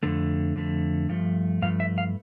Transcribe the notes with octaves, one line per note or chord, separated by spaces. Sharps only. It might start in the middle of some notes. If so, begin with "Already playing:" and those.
F2 D3 A3
F2 D3 A3
G2 F3 A3
G2 F3 A3 F5
E5
F5